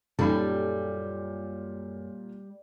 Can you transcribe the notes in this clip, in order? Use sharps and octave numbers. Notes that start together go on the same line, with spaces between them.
F#2 A#2 G3 C#4 D#4 G4 A4